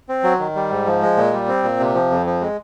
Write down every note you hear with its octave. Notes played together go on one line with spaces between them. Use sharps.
C4
F#3
D#3
G3
G#2
F3
G#3
A#2
G3
C4
A#2
C3
F3
F2
F3
G#3